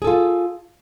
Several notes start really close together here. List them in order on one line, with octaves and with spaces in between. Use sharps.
G#4 A4 F4